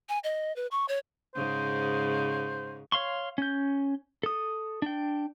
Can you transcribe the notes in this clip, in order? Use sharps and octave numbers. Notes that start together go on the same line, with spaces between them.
G#5
D#5
B4
C#6
C#5
G#2 C#3 C5
C#5 F5 C6 C#6
C#4 G6
A4 D#6
D4 G5